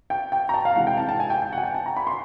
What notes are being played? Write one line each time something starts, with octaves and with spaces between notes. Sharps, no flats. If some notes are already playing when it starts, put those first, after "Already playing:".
G5
G5
A#5
A5
F5
C3 E3 G#3 F#5
G5
A5
A5
G#5
G5
G5
F#5
G#5
G5
A5
A#5
B5
C6